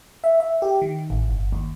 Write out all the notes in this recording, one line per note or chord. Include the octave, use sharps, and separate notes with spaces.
E5
E5
G4
D#3
A1
G1
D#2